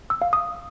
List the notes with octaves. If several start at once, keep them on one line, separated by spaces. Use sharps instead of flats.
E6
F5
D#6